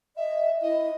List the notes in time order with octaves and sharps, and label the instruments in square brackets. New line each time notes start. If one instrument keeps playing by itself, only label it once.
[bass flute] D#5 [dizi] E5
[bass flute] E4 [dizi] D#5